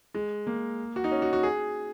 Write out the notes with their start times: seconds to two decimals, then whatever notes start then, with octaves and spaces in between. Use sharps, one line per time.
0.14 G#3
0.47 A#3
0.96 F#4
1.04 D#4
1.12 C#4
1.22 F#4
1.33 F#4
1.43 G#4